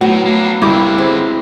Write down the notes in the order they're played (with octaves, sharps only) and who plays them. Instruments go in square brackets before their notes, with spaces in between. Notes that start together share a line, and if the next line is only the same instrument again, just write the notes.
[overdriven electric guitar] A2 [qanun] F#3 B3 [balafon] A3
[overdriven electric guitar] A#3 D4
[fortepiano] C2 D6 [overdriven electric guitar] G2 D3 [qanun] E4
[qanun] G#3 [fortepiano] C4